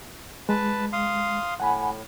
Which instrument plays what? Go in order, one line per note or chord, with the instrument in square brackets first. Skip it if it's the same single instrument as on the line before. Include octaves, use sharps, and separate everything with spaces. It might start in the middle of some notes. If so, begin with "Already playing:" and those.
[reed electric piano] G#3 [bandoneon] B4 A5
[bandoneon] F5 C6 D#6
[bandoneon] A2 [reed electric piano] F#5 G#5 B5